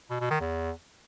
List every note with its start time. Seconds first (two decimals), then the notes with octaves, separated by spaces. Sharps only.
0.10 B2
0.20 B2
0.31 D#3
0.41 E2